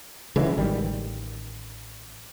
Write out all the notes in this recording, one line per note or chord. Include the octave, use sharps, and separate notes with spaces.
C#3 E3 F#3 G#3
A1 D#3 G3